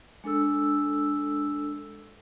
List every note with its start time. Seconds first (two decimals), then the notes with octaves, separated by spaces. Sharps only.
0.24 G#3 D4 A4 E6